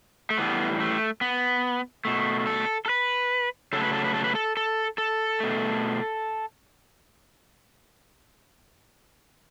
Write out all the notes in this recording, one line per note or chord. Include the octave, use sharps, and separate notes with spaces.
A3
A2 E3 G3 B3
A3
B3
B2 A3
A4
A4
B4
C#3 F#3 A3 A4
B4
A4
B4
A4
B4
A4
A4
A4
B2 A3